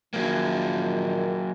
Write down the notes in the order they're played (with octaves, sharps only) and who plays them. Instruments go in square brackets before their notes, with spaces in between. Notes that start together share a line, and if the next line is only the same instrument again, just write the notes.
[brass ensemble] A#1 A#2 D#3 [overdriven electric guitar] F#3 A#3